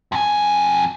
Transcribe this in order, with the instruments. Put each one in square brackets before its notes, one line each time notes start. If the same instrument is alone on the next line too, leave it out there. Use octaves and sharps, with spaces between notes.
[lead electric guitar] F2 G#5